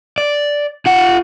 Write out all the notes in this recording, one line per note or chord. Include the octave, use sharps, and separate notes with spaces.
D5
F4 F#5